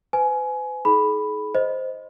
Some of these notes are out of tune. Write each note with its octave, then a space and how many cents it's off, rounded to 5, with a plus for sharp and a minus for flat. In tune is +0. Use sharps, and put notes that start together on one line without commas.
B4 +45 G#5 +20
E4 -45 G#4 +40 B5 +0
C5 +0 D#5 +0